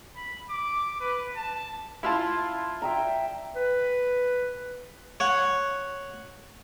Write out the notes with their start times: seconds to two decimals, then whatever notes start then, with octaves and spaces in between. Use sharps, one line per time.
0.16 B5
0.50 D6
1.00 B4
1.36 A5
2.03 E4 F4 A5
2.82 E5 G5 A#5
3.56 B4
5.20 C#5 F#5